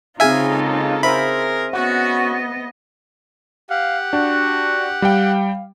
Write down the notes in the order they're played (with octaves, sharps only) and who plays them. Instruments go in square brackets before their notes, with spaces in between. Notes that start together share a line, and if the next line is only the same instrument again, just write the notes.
[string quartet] C#3 D#4 F4 [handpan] C4 G#4 F5 [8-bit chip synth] E5 G#5
[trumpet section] G#3 A#3 A4
[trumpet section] G#4 A#4 [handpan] C5 E5 [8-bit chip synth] B5
[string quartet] B3 D#5 [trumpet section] C#4 F#4 [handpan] F#5
[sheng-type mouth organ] G4 F#5 [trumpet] F5
[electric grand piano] D4 [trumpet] F#4
[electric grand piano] G3 G5 [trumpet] F5